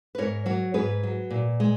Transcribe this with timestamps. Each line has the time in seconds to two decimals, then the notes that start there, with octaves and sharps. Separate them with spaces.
0.15 B4
0.18 G#2 A#4 C#5
0.46 F#3 A#4 C#5
0.74 G#2 G#4 B4
1.03 F#3
1.30 A#2
1.60 G#3